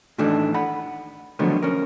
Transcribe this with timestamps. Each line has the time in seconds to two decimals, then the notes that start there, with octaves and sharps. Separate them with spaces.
0.18 A2 D#3 E3 A3 D4
0.54 F#5 B5
1.39 D3 D#3 F3 F#3 A3 B3
1.63 C#4 A#4